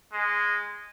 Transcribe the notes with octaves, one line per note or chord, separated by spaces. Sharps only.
G#3